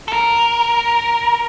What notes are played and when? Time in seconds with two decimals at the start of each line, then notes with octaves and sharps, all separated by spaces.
0.08 A4
0.13 A#4